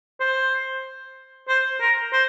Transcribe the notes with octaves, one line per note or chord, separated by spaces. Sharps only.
C5
C5
A#4
C5